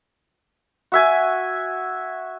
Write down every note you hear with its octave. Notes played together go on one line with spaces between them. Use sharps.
F#4 E5 G#5